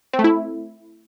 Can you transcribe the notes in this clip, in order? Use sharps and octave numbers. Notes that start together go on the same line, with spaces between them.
C4
A3
E4